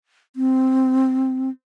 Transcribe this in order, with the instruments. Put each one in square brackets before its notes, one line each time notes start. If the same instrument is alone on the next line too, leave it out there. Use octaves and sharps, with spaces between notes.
[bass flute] C4